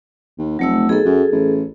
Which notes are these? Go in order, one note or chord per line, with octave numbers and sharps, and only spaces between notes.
D#2
F1 F#3 A3 E6
B1 G#4 A4
F#2
A1